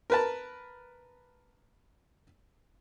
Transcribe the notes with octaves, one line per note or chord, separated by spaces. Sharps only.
A#4 B4 A5